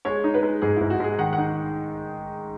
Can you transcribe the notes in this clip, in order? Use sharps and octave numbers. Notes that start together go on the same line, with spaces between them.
G#3 C#5
D#4
B4
G#3
G#2 G#4
G#2 E4
F#4
G#3 G#4
D#3 F#5
F#5
D#4